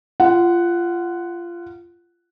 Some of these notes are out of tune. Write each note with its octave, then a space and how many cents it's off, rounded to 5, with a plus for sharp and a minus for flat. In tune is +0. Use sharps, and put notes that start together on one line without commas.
F4 -20 F#5 +5